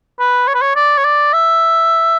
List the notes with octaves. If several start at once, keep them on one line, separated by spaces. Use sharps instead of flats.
B4
C#5
B4
C#5
D5
C#5
D5
E5